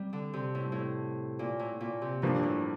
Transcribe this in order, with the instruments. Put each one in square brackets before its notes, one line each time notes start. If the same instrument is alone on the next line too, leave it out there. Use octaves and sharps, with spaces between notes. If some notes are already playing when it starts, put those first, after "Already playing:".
Already playing: [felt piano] C3 [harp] G3
[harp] D3
C3
A2
A2
A#2
A2
A#2
C3
[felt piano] G2 F3 A#3 D4 [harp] A#2
[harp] A2